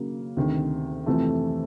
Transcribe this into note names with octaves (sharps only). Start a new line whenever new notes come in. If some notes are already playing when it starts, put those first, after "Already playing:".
Already playing: C#3 F#3 A#3
D2 C3 D#3
F2 C3 E3 A3